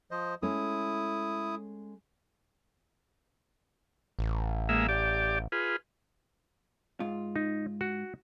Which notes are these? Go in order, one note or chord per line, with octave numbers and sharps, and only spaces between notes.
F3 C5 D#5
G#3 A3 C#4 E4 D#6
A1
G#3 A#3 E5
G4 D5
F4 G#4 B4
G#2 F4
D#4
F#4